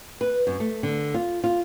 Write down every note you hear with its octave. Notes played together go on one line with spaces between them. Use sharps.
B4
F#2
A3
D3
F4
F4